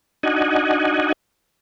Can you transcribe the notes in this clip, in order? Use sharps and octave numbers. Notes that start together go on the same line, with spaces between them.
D4 D#4 F#4 D#5 F#5 G#5